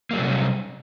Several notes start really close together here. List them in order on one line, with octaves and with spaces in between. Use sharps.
A#3 F#3 G3 C3 C#4